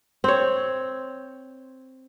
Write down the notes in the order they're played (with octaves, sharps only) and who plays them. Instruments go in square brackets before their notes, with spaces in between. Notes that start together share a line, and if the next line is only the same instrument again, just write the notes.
[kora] C4 C#5